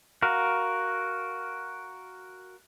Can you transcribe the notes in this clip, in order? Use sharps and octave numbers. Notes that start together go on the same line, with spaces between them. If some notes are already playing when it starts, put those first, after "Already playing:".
F#4 A#4 F5